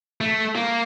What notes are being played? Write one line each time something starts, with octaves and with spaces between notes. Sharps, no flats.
A3
A#3